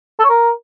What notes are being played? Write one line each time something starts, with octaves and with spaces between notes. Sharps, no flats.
A4
C#5
A#4